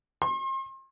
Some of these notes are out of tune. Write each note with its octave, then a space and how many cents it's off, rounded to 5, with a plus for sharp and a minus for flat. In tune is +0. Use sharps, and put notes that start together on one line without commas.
C6 +40